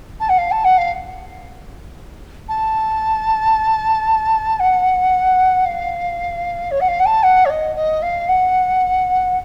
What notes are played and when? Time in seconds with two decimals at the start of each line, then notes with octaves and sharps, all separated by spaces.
0.20 A5
0.29 F#5
0.38 F5
0.51 A5
0.64 F#5
0.78 F5
2.49 A5
4.60 F#5
5.65 F5
6.71 C#5
6.80 F#5
6.88 F5
6.99 F#5
7.06 A5
7.23 F#5
7.45 C#5
7.50 D#5
7.76 D#5
8.02 F5
8.29 F#5